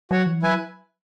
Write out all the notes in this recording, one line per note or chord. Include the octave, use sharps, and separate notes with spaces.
F#3 F#4 C#5 F#5
E3
F#3 E4 B4 G#5